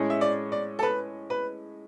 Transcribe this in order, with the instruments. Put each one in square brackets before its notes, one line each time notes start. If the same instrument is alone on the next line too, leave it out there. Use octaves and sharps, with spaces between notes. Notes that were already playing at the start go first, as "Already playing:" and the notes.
Already playing: [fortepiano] A2 G#3 C#4 G#4
[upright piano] E5
D5
D5
A4
B4
B4